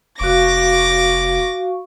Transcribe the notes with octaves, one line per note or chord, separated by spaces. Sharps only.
F1 F#4 F5 C#6 D6 A#6